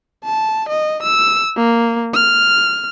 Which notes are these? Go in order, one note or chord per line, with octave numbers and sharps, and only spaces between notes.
A5
D#5
E6
A#3
F6